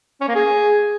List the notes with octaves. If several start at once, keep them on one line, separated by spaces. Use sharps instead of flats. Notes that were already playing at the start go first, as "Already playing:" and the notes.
C#4
A#3
G#4